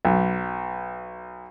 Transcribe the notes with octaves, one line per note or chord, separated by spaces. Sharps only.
B1